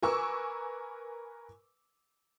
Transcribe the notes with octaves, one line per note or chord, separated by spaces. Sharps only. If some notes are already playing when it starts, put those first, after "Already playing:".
A#4 B4 G#5 C#6 D6 E6